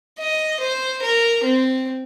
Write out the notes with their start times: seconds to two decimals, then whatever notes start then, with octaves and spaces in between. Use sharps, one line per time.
0.19 D#5
0.60 C5
1.02 A#4
1.44 C4